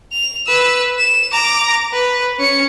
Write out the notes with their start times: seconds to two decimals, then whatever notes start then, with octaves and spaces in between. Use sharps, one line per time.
0.12 F7
0.46 B4 E6
0.98 E7
1.32 A#5 D6
1.93 B4
2.38 C#4 C#7